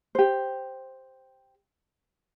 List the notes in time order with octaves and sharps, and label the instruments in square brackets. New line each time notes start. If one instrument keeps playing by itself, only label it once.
[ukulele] G4 C5